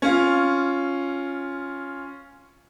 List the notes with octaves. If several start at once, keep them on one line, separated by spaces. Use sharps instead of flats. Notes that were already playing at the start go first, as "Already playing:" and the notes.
C#4 F4